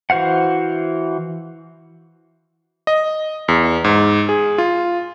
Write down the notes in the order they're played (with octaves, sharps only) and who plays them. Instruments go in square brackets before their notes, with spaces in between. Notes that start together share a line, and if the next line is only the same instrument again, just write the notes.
[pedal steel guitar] E3 F#4 C5 F5 F#5
[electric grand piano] D#5
E2
G#2
G#4
F4